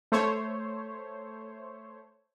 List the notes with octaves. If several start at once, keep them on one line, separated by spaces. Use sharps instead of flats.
A3 C5 C#5